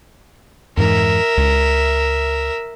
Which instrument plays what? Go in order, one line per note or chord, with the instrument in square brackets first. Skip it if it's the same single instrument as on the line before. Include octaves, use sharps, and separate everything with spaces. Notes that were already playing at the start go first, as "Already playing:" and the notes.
[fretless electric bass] F2 G#2 E3 [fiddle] A#4 E5
[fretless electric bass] C#2